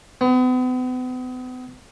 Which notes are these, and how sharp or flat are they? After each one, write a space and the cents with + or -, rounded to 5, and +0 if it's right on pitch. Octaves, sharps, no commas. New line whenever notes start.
B3 +40